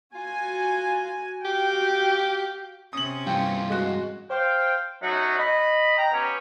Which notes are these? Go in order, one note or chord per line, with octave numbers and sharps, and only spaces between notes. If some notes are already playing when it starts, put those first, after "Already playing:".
F4 F#4 G#5
F#4 G4 F5 G5
C3 C#4 D#6 F#7
G2 E3 F4 G5
G#3 F#4
C5 F5 G5
F#2 F#3 A3 D#4 F#4
D#5 B5
G5 A#5
B3 C#4 G4 C#5